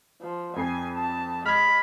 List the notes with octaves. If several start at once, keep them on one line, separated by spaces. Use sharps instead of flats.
F3
F2 G#5 C7
A5
G#3 B5 F6 G#6